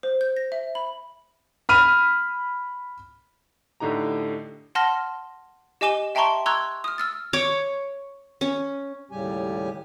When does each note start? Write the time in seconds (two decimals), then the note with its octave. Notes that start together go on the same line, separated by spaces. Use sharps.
0.03 C5
0.21 G6
0.37 A#6
0.52 E5
0.75 B5
1.69 B5 F6 D#7
3.80 A2 D3 D#4 G4 A#5
4.75 F#5 A5 C6 F6 A#6
5.81 G4 D#5 G#5 D6 E7 G7
6.15 E5 G5 A5 A#5 C6 C#6
6.46 A#5 C6 C#6 E6 F#6 G#6
6.84 D#6 F6
6.98 E6 F6 A6
7.33 C#5 D6
8.41 C#4
9.11 D#2 A2 C#3 G3 G4 G#5